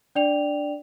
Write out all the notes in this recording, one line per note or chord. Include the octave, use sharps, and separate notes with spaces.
D4 D5 G5 F7